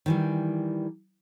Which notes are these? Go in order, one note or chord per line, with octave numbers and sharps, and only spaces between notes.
D#3 E3 G3